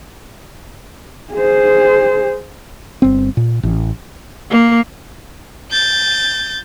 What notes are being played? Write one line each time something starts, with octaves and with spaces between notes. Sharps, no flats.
G#4 C5
G1 C4
A#2
A1
A#3
G6 A6